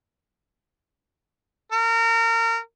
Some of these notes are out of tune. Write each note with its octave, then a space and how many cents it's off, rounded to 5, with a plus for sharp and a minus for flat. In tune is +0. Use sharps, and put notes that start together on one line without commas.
A#4 -30